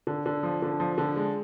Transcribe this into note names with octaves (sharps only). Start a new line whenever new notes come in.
D3
D3
F3
D3
F3
D3
G#3